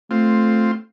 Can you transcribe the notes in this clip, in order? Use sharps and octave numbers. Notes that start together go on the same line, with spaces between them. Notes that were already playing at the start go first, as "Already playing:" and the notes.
A3 C4 F4